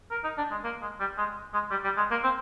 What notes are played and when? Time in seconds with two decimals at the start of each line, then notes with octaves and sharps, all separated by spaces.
0.11 A#4
0.24 D#4
0.37 D4
0.51 G#3
0.64 A#3
0.82 G#3
1.00 G3
1.18 G#3
1.53 G#3
1.71 G3
1.84 G3
1.97 G#3
2.11 A#3
2.24 C4